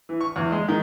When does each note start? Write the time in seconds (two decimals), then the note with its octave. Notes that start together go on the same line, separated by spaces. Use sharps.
0.09 E3
0.21 C#6
0.36 E2
0.52 G#3
0.68 D#3